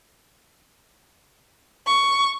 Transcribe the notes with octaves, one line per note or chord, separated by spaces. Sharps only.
C#6